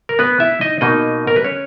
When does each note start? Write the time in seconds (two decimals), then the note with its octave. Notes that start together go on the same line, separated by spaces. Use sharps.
0.09 A#4
0.19 B3 B4
0.40 E4 E5
0.61 D#4 D#5
0.81 B2 A#3 D#4 D#5
1.27 A#4
1.36 B4
1.44 C#4 C#5